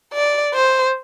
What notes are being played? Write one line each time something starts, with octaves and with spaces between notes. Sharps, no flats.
D5
C5